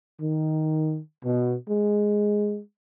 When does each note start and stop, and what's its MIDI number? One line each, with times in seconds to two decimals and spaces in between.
0.20 0.98 51
1.24 1.55 47
1.69 2.60 56